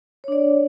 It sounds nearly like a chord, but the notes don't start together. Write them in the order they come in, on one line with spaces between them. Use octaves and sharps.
C#5 D4 D5